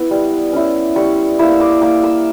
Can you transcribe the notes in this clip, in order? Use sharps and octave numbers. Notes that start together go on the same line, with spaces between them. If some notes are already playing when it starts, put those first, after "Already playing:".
Already playing: B3 E4
G3
C#4 E4
G3 C#6
A#3 E4 E6
D6
A#3 D6
E6